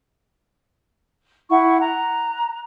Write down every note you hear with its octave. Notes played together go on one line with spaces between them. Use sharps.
E4 F#5 C#6
A#5 F#6